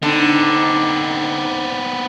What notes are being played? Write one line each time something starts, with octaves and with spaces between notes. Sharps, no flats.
D3 B3 C4 D#4